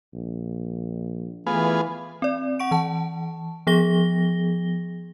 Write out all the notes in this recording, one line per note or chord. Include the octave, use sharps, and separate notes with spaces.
A#1
E3 A3 B3 F4 G#4
C4 D5
F#5 C#6 D7
E3 A5
F3 B3 G#4 A#6 G7